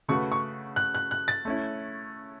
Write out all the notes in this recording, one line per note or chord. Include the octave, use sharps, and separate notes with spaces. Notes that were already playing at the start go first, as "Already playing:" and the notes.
C#3 A3 F#4 B4 C#6
C#6
F#6
F#6
F#6
A6
A3 C#4 E4